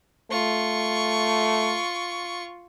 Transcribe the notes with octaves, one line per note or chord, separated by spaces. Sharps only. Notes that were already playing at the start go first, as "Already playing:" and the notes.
A3 F4 C#6